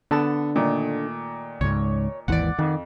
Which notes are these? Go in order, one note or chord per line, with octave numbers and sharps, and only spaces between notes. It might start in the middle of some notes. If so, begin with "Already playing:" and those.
D3 B3 A4 A5
A#2 D#3 A3
C#2 G#2 C#5
G#1 D#2 E3 D5 F#5
F2 D#3